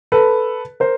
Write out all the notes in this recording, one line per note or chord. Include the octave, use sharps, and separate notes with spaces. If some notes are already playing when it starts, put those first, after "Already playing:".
A4 B4
A#4 C5